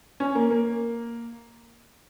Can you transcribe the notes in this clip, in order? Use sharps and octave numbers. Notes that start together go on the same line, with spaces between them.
C#4
A#3
A#3